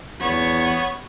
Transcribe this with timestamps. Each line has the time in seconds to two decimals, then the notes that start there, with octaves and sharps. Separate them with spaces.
0.21 E2 B3 C#5 C#6